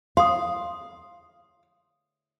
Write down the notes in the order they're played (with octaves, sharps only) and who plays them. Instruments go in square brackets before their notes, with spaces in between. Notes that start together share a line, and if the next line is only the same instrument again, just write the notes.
[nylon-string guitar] F5 [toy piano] C6 D#6